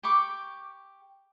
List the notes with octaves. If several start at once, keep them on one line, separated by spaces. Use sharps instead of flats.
G4 B5 C#6 D6